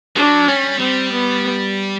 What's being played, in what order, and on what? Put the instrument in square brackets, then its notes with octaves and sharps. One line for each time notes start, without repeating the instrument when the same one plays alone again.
[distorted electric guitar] F#3 [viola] D4
[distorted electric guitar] G3 [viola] C#4
[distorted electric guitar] G3 [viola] C4
[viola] B3